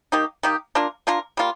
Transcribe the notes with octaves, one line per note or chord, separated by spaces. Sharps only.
D#3 A#3 D#4 G4
D#3 A#3 D#4 G4
A#3 D4 F4 A#4
A#3 D4 F4 A#4
G3 A#3 F4